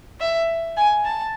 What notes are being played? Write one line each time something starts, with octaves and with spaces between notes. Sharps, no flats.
E5
G#5
A5